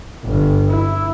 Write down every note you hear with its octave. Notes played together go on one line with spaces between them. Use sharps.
G1
E4